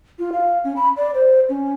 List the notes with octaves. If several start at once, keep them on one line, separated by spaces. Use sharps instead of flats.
F4
F5
C#4
B5
D5
C5
C#4